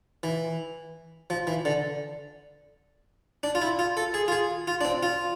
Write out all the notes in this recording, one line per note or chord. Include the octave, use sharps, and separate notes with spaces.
E3
F3
E3
D3
D4
F4
E4
F4
A4
G#4
F4
G#4
F4
D4
C4
F4